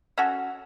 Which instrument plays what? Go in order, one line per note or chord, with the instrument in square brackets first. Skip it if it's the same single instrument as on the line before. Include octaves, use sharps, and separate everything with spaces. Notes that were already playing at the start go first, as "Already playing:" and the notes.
[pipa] C#4 F#4 A4